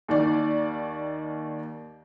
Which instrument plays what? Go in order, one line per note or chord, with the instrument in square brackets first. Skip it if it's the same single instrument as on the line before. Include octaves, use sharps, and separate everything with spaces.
[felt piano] D#2 D#3 D5